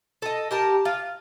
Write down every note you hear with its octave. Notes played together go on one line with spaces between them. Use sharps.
A4 D#5
G4 A#4 A5
F4